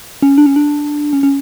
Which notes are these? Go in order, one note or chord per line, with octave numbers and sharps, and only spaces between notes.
C#4
D4
C#4
D4
C#4
C#4